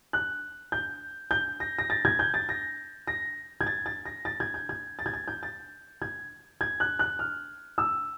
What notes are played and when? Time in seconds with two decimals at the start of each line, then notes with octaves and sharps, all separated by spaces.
0.13 F#6
0.72 G6
1.31 G6
1.60 A#6
1.79 A#6
1.90 A6
2.05 G#6
2.19 G6
2.34 A6
2.49 A#6
3.07 A#6
3.61 G#6
3.66 A6
3.86 A6
4.06 A#6
4.25 A6
4.40 G#6
4.54 G6
4.69 G#6
4.99 A6
5.06 G#6
5.13 A6
5.28 G6
5.43 A6
6.02 G#6
6.61 G#6
6.80 F#6
6.99 F#6
7.19 F6
7.78 E6